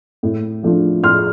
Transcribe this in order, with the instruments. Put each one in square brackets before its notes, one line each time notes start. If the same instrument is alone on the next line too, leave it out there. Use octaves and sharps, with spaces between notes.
[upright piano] A2
F3 A3 D4 F4
A2 C6 F6